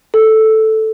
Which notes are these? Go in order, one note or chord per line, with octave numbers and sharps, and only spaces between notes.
A4